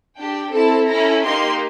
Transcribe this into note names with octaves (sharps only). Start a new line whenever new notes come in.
D4 G4 G5
C4 E4 A4 A5
C#4 E4 A4 A#5
A#3 D#4 G4 C6